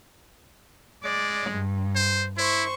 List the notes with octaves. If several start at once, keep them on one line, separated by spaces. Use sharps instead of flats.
G#3 D5
G2
C5
E4 C5 C#6